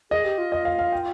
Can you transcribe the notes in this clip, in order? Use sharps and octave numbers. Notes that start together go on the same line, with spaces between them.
G#4 D#5
G4
F4
D#5
F5
F5
G5